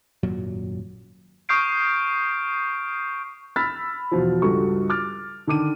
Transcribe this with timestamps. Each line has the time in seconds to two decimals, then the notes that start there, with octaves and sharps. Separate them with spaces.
0.23 G#1 F#2 A#2 F#3
1.49 C#6 D#6 F6 G6 C7 D7
3.56 B5 E6 F6 A6 B6
4.11 E2 B2 F3
4.42 C#2 G2 G3 F#4 A4 C#6
4.90 D6 F6 A6
5.47 D3 D#3 D6 D#7